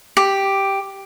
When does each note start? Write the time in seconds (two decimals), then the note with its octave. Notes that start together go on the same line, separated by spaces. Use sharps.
0.17 G4